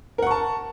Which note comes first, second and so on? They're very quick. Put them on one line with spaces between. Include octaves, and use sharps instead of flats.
A#4 F#5 C#6 A5